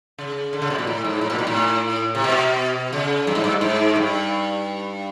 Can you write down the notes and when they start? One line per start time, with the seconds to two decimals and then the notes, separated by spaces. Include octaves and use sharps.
0.18 C#3
0.53 D3
0.62 C#3
0.70 B2
0.78 A#2
0.87 A2
1.04 G#2
1.21 A2
1.30 A#2
1.39 B2
1.47 A2
2.15 C3
2.24 B2
2.93 C#3
3.27 G2
3.35 G#2
3.44 G2
3.61 G#2
3.96 G2